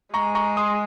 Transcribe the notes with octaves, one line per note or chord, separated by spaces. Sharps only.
G#3 A#5 C#6
A#5 C#6
C6 D#6